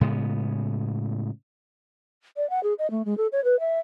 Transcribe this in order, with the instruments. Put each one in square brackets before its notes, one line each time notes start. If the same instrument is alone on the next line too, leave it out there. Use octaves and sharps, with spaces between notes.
[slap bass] A2 C#3 G#3 B3
[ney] D5
F#5
G#4
D#5
A3
G#3
A4
C#5
B4
E5